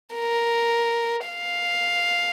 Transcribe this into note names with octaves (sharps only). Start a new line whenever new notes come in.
A#4
F5